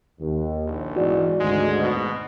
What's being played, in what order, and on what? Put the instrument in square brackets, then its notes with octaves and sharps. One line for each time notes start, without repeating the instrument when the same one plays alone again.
[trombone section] D#2
[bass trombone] A#1
[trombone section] E2 G#2 [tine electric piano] F#4 D5
[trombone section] G#1 D2 G#2 [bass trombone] G#3
[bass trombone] B2